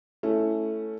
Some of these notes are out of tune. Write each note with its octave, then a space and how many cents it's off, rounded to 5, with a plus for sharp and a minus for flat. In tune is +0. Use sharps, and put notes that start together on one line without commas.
A3 +0 C#4 +0 E4 +0